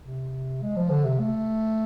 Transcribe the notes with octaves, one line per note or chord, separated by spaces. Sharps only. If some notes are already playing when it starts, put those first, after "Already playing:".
C3
G#3
F3
D3
C3
A3